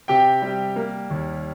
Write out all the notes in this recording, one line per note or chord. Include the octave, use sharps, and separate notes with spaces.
C3 G4 G5
G3
A#3
D#2